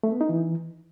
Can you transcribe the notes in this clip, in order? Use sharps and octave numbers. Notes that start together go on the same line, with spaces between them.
A3
B3
D#4
E3